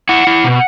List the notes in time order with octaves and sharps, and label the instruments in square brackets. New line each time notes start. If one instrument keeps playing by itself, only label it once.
[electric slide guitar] E4 F#5
E4
B2